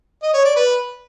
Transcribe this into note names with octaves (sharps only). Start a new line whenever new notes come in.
D#5
C#5
D5
B4